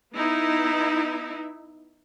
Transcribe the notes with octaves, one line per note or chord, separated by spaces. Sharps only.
B3 D#4 E4